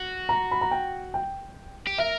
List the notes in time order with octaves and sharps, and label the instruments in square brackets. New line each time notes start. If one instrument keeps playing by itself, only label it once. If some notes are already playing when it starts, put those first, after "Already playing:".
Already playing: [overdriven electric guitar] F#4
[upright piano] A#5
B5
A#5
G5
G5
[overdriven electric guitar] G4
[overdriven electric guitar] A#4 [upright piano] E5